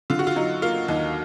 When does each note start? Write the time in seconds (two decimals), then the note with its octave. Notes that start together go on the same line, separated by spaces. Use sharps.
0.10 D3 F4
0.19 F#4
0.27 F4
0.36 F#3 D#4
0.62 A#3 F4
0.88 D#2 D#4